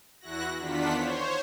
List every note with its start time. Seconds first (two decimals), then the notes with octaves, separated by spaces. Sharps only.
0.20 E2 E4 F#4 F#6 A#6
0.59 E2 D#3 D4 F4 F#5 B6
0.93 C5 C#5